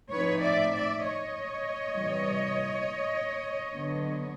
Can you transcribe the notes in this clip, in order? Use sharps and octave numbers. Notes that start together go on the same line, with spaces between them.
A2 F3 A3 C4 D#4 B4 C#5
D5 E5
D5 E5
C#5 D#5
C3 E3 G3
D3 F#3 B3